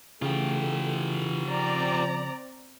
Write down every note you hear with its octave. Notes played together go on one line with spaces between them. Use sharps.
C#3 E3 A3 F4 G4
F3 C4 D5 A#5